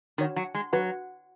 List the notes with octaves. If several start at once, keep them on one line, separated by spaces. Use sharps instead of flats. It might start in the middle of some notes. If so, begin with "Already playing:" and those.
D#3 F#4 C#5 F#5
F#3
G#3
F#3 F#4 B4 F#5